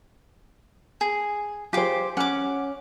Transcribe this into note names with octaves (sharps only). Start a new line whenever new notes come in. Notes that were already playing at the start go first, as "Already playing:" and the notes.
G#4
F4 G4 G#4 C5 D6
C#4 F#5 D6